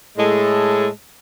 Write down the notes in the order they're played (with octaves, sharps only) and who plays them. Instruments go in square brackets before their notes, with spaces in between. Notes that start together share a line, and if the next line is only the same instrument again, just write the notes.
[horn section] A2 G#3 A4